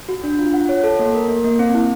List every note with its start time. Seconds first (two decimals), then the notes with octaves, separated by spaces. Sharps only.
0.09 F#4
0.24 D4
0.39 F4
0.54 F#5
0.69 C#5
0.84 A4
0.99 A#3
1.14 A#4
1.28 A#3
1.44 A#3
1.59 C4
1.74 E4